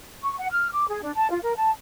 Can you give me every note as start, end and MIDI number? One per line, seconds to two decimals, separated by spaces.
0.23 0.37 85
0.38 0.47 78
0.52 0.68 89
0.72 0.87 86
0.88 1.01 68
1.03 1.12 62
1.16 1.30 81
1.31 1.39 65
1.43 1.54 70
1.56 1.70 81